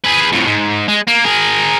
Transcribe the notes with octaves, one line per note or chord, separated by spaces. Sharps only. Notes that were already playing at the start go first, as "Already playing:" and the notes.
G#4 B4
F2 A2
G#2
G#3
A#3
G#4 A#4